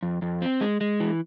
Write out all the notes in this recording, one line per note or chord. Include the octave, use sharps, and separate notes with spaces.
F2
F2
C4
G#3
G#3
E3